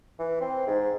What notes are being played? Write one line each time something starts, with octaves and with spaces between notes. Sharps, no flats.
E3
C4
G#2